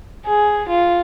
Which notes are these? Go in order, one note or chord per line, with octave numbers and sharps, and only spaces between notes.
G#4
F4